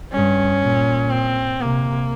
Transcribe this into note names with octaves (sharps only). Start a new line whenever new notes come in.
G2 C#4
A#2
C4
C3 A#3